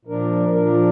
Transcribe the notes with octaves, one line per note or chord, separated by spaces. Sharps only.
A#2 F3 D4 A#4
A#2 F3 D4 A#4